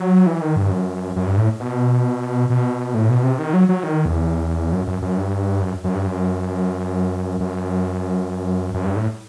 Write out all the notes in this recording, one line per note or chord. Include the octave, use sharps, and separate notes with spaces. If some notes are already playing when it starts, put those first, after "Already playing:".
Already playing: F#3
E3
D#3
G2
F#2
F#2
G2
A2
B2
B2
A2
B2
C3
D#3
F#3
F#3
D#3
E2
F#2
F#2
F#2
G2
F#2
F#2
G2
F#2
F#2
F#2
G2
A2